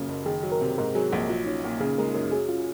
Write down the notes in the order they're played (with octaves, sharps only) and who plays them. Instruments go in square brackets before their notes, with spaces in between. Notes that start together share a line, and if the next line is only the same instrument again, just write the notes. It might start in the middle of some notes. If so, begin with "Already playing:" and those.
Already playing: [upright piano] F#2 A#2 C#3 [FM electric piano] A#4
[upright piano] F#1
[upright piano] D#3 [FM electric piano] G#4
[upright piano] F#3
[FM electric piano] A#4
[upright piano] C3
[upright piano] G#2 [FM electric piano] A#4
[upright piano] F#3 [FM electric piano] G#4
[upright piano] A#1 [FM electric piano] F#4
[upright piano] F#3 [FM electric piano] F4
[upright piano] C#4 [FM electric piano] D#4
[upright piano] A#2
[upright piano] C#3 [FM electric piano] G#4
[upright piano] G#3 [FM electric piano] A#4
[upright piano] F#2 [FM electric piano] A#4
[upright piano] F#3 [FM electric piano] G#4
[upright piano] C#4 [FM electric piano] F4